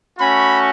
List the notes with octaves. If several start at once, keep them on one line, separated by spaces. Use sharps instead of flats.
A3 C#4 F#4 B5